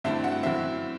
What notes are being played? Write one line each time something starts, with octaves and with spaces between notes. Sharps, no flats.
G2 D3 A3 C4 E4 E5
F#4 F#5
F#2 F#3 C4 E4 E5